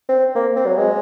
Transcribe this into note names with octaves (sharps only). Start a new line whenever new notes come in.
C4
A#3
C4
F#3
G#3